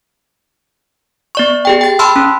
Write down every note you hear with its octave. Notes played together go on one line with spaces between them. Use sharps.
B3 D5 C#6
G4 G#4 G5
G5 A6
G5 A5 B5 C6 E6 F6
C#4